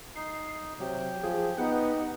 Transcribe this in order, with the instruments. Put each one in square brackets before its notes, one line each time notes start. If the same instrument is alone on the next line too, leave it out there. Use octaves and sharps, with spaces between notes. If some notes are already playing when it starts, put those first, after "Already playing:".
[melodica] D#4 [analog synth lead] C7
[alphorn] C3 [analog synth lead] F#3 [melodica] G4
[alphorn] F3 [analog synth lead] G#4
[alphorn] B3 [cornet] D#4 [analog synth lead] F#5